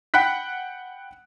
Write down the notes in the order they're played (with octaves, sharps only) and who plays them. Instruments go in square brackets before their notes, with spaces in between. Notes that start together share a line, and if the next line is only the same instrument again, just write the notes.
[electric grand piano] F#5 G5 B5 F#6 B6